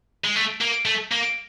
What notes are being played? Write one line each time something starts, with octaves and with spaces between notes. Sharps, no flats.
G#3
A3
A#3
A3
A#3